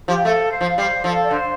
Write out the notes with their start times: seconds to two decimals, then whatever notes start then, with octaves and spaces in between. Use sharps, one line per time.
0.08 F3 G4
0.25 A3 A4
0.52 C5
0.61 F3
0.78 G3 C5
1.04 F3 A4
1.24 D5
1.31 D3 C5